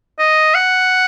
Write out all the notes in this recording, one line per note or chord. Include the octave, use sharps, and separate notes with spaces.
D#5
F#5